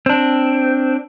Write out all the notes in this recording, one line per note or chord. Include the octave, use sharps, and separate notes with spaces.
C4 D4